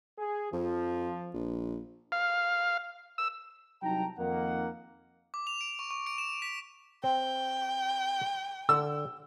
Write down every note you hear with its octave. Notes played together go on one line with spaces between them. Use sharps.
G#4
F2 F3
A#1
F5
E6
C2 F#3 D#4 G5 A5 A#5
F2 D#3 A#3 F#5
D6
F7
D7
C#6
C#6
D7
E7
B6
C4 G5
D3 E6